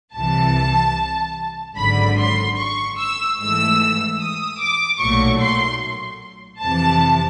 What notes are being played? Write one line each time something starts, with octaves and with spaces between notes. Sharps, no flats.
C2 C3 E3 A5
G#1 F#2 D3 B5
C6
C#6
E6
G#2 E3 A3 E6
D#6
D6
B1 A#2 F#3 A3 C#6
C6
F2 C3 E3 A5